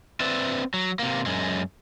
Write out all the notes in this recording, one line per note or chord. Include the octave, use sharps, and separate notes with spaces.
C4 B4 D5 E5
F#3
C3 A#3
F#2 G#3